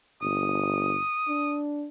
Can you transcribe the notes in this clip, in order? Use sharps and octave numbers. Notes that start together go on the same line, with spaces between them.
G1 D#6
D4